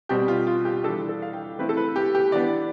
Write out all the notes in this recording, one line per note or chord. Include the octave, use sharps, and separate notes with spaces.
B2 G3 C4 G4
F4
F4
G4
E3 G3 D4 A4
A4
F5
G5
E3 A3 C4 E4 B4
A4
B4
G4
G4
E3 B3 D4 D5